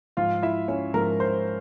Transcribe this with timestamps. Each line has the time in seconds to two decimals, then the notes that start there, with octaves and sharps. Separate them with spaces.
0.17 G#2 F3 F4 F5
0.43 E4 E5
0.68 C#4 C#5
0.94 G#2 F3 A#4
1.20 C5